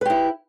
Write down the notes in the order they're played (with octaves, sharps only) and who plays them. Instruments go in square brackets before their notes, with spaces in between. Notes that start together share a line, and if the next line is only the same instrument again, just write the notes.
[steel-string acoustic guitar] B4
G4
E4